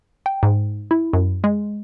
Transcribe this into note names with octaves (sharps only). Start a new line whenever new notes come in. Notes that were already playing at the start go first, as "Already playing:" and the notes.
G5
G#2
E4
F#2
G#3